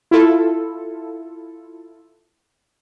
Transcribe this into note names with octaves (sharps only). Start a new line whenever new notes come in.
E4 F4 A4